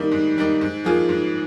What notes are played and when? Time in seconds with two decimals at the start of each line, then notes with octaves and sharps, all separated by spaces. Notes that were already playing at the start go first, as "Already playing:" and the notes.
Already playing: D#3 G3 A#3 D#4
0.11 G#2
0.37 D#3 G3 A#3 D#4
0.61 G#2
0.84 F3 A#3 F4 G#4
1.09 G#2